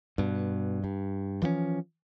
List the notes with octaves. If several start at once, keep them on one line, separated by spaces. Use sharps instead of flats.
G2 B2
G2
E3 F3 C4 C#4